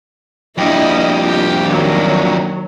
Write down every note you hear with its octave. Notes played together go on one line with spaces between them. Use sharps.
F2 G3 A#3 D4 E4 D#5 G5
F4 G4
D#3 F#3